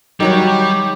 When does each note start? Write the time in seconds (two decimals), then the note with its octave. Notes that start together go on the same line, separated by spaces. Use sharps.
0.20 D#3 F#3 G3 F#4 G4